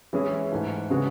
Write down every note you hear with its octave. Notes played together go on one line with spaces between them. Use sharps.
E3 G#3 C#4 E4 G#4
G#2 E3 A3
C#3 G#3 B3 F#4